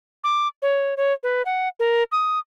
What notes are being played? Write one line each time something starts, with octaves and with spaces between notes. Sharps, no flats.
D6
C#5
C#5
B4
F#5
A#4
D#6